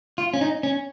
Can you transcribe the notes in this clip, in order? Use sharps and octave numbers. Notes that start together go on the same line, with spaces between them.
F4
C#4
D#4
C#4